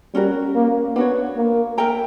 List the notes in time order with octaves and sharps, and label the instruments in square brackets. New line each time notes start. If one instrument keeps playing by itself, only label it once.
[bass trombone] G3 [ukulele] C#4 F#4 A#4
[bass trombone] A#3
[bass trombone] B3 [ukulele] D4 F#4 C#5
[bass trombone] A#3
[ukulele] A#4 E5 G5 A#5